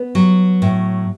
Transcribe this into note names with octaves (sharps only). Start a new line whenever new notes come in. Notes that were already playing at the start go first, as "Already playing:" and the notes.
Already playing: B3
F#3
A2